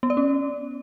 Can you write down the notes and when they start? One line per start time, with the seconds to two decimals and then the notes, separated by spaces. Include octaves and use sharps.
0.03 B3
0.10 D5
0.17 C#4